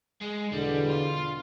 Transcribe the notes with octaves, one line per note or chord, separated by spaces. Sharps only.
G#3
E2 B2 D3 G3
F4